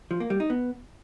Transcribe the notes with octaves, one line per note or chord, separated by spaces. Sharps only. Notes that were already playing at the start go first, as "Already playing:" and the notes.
F3
A#3
G3
D#4
B3